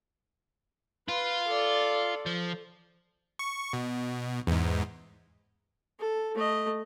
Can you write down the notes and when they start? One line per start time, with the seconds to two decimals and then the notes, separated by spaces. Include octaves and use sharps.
1.08 F4 B4
1.47 A4 D5
2.26 F3
3.39 C#6
3.73 B2
4.47 E2 G#2
6.00 A4
6.36 A3 D#5